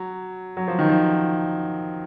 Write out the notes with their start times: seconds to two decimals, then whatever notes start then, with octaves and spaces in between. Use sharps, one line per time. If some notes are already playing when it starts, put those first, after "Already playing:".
Already playing: F#3
0.57 F#3
0.68 F3
0.79 D#3
0.90 F3